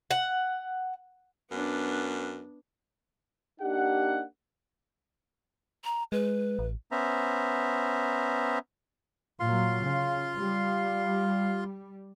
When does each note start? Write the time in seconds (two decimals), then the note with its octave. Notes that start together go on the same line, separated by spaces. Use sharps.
0.11 F#5
1.51 F#2 B3 D4
3.60 A#3 D4 D#4 G4 F#5
5.85 A#5
6.12 G#3 B4
6.59 A1
6.92 B3 C#4 C5 E5 A#5
9.40 A#2 F#3 F4 F5 C6
9.81 C#3
10.34 G3